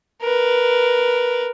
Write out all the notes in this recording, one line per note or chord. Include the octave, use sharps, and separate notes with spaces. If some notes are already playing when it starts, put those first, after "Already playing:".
A#4 B4